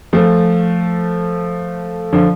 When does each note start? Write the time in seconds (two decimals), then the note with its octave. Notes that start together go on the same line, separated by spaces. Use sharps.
0.13 F3 A3
2.13 D3 F3